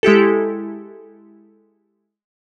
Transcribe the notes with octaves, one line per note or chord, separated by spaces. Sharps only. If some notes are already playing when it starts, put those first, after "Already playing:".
G#3 E4 G4 A4